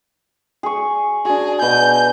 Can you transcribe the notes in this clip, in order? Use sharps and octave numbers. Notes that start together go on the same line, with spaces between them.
G#4 C#6
D4 F#4 G#4
B2 G#5 G6